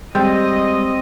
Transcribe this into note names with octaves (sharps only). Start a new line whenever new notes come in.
G3 G#3 C4 D#5